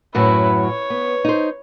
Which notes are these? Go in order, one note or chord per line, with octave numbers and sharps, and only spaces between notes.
F#2 A2 F#3 E4 B4
C#5
B3
D#4 C5